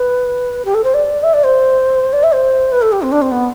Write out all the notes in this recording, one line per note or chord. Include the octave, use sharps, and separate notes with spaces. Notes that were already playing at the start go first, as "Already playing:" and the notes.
Already playing: B4
G4
A4
C5
D5
E5
D5
C5
D5
E5
C5
B4
A4
G4
C4
D4
C4
B3